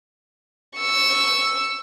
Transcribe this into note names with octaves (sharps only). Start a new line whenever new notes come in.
C#6 E6